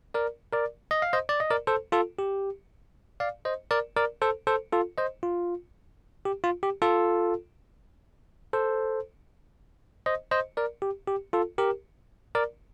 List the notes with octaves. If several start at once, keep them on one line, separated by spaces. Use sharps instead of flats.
A#4 D5
A#4 D5
D#5
F5
C5 D#5
D5
D#5
A#4 D5
A4 C5
F4 A4
G4
D5 F5
C5 D#5
A#4 D5
A#4 D5
A4 C5
A4 C5
F4 A4
C5 D#5
F4
G4
F4
G4
F4 A4
A4 C5
C5 D#5
C5 D#5
A#4 D5
G4
G4
F4 A4
G4 A#4
A#4 D5